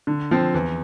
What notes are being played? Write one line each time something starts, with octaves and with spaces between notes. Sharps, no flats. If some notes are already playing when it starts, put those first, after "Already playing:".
D3
F3 C4
E2